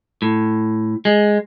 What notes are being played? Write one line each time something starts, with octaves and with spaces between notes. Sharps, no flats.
A2
G#3